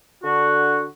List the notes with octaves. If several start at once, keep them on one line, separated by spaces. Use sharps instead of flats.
D3 F#4